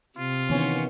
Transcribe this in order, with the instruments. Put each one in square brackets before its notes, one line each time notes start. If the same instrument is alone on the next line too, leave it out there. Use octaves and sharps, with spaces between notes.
[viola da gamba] C3 [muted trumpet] F4
[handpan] D#3 E3 B3 [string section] C#4 C5